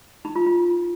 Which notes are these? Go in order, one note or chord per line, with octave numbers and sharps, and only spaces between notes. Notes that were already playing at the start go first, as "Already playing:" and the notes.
D#4
F4
F4